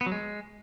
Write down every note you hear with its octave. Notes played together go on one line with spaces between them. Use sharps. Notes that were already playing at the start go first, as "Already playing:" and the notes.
B3
F#3
G#3